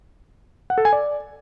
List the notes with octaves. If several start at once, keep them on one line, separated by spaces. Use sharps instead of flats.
F#5
A4
G#5
D5